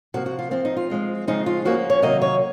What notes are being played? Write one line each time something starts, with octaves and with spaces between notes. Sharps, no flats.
C3 F3 A#3 F#4
F#4
F4
F3 C4 F4
D#4
F4
F3 G#3 C4
C#3 F3 G#3 C4 D#4
F4
F3 A#3 C#4 F#4
C#5
C3 D#3 F#3 A#3 D#5
C#5